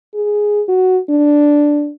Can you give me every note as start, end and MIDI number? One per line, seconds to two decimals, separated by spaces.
0.15 0.63 68
0.69 0.99 66
1.10 1.91 62